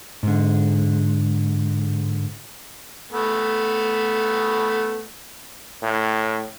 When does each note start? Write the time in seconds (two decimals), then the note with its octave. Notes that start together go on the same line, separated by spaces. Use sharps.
0.23 G#2 D3
3.12 A3 B3
5.83 A2